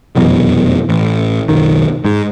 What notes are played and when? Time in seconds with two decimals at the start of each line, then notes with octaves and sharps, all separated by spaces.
0.15 F1 F#2 B2 E3
0.89 A1
1.49 F#1 B1 D#3
2.05 G#2